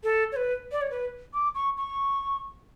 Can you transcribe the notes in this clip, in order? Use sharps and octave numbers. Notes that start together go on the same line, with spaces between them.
A4
C#5
B4
D5
C#5
B4
D6
C#6
C#6